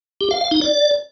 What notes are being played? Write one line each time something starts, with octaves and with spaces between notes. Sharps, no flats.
G4
F5
F5
D#4
D5